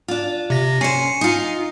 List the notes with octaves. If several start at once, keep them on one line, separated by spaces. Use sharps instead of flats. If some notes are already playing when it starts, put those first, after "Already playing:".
D4 F4
C3 A#6
C#4 C5 G#5 C7 C#7
D#4 F4